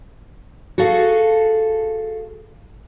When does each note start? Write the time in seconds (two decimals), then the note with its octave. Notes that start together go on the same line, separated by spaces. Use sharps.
0.78 F#4 G#4 A4 F5